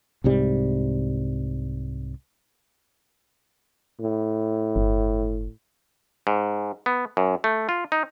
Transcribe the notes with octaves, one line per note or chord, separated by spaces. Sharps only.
C2 G#2 C3 G3
A2
G1
G#2
B3
F#2
A3
F4
D#4